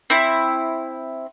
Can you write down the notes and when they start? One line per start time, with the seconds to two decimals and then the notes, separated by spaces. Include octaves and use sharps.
0.10 C4 E4